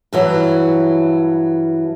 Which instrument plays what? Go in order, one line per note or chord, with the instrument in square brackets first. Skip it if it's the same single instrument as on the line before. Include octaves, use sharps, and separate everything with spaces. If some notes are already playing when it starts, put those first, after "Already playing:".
[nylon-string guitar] G2 E3 F#3